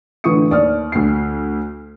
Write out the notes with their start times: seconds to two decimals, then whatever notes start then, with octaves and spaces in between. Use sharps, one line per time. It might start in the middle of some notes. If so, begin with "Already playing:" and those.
0.24 A2 D3 E3 C#6 D#6 C#7
0.51 D#2 D5 D#6 F6
0.92 D2 C7